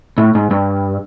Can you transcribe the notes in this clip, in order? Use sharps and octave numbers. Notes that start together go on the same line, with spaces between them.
A2
G#2
G2